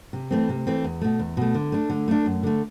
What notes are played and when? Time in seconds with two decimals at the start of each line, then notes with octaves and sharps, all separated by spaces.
0.13 C3
0.31 E3 A3 C4
0.49 C3
0.67 E3 A3 C4
0.84 E2
1.01 B2 A3
1.19 E2
1.37 B2 A3
1.54 D3
1.72 A3 D4
1.90 D3
2.08 A3 D4
2.26 F#2
2.43 D3 A3